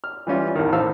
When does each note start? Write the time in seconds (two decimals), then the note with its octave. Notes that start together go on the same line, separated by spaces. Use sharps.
0.04 F6
0.27 E3 G3 C#4 F4
0.55 A1 E2 D#3
0.73 A2 C5 F5 E6